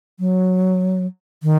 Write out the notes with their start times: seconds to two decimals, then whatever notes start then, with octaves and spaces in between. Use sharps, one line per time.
0.20 F#3
1.43 D#3